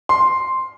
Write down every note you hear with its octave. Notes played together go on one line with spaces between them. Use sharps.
C6